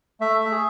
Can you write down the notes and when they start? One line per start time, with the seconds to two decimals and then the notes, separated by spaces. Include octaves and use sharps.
0.20 A3 E5
0.41 E5
0.51 G#4